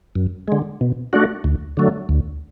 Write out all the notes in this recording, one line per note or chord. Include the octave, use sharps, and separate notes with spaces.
F#2
D3 G#3
B2
A3 D4 F#4
D2
D3 F#3 A3
D2